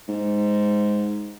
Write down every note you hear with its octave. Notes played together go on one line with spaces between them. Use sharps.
G#2